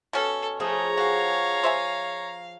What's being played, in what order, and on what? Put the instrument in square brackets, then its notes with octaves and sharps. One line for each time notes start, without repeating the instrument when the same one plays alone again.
[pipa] B2 C#4 [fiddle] A4
[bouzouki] F3 G#4 [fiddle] A3 [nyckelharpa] C#5 A#5
[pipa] F#4 [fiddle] F5
[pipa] C5 E5 G#5